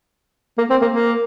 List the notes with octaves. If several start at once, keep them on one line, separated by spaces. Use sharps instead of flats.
A#3
C4
A#3
A#3